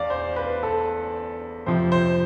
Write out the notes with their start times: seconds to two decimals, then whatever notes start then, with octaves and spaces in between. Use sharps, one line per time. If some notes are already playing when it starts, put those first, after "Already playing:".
Already playing: E2 D5 F5
0.10 C5
0.36 B4
0.63 A4
1.66 F2 C3 F3 C5
1.92 C5